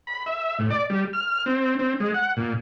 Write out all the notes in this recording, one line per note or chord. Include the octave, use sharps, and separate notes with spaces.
B5
E5
A2
D5
G3
F6
C4
C4
G#3
F#5
A#2